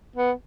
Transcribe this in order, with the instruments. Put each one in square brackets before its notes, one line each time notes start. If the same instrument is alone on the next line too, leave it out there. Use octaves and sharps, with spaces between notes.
[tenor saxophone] B3